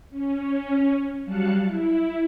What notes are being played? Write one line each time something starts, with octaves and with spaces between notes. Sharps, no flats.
C#4
F#3 G3 F5 A5 F#6 C#7
E4